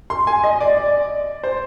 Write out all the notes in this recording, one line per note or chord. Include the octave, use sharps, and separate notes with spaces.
C6
G#5
D#5
D5
D5
C5